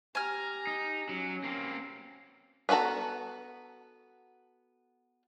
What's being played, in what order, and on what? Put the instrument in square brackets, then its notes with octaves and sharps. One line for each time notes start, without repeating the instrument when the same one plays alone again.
[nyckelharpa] G4 A#5 [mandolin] G#5 F6
[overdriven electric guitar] D#4
[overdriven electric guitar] F#3 [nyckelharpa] C#4
[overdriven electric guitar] A#3 C4
[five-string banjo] B3 C#4 F#4 A4 A#5